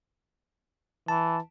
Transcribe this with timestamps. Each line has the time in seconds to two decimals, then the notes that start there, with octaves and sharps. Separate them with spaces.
1.08 E3 A5